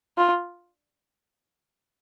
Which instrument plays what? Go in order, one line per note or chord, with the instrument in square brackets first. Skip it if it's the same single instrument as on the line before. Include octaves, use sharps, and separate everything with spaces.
[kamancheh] F4